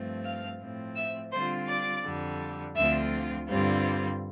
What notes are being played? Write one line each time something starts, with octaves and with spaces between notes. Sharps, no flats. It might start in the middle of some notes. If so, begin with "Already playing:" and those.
Already playing: G2 F3 A3 C4
F5 F6
A2 F3 C4
E5 E6
D3 G3 C4 F4 C5 C6
D5 D6
F2 D3 G3
D2 D3 F3 C4 F4 E5 E6
G2 D3 G3 C4 F4